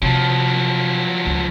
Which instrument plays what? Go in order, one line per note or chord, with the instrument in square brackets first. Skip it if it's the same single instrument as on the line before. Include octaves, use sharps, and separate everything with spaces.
[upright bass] C3 [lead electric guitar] F3 F#3
[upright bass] C#2